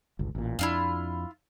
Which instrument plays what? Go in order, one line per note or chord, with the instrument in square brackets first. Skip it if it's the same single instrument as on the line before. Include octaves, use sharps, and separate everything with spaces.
[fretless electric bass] G1 C#2
A1 A#2
[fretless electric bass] F2 D4 [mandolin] E4 F4 F5